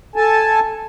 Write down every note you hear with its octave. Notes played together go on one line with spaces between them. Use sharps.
A4 G#5 A5